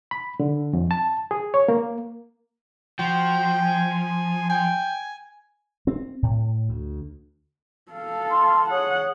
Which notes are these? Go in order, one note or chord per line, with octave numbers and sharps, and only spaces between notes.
B5
D3
F2
A5
G#4
C#5
A#3
F3 F#4 G5
G#5
G5 G#5
C4
A2
D2
A4 F5
A5 B5 C6
G#4 C#5 F#5 D#6